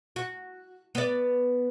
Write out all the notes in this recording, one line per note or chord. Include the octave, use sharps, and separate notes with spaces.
F#4
B3 D5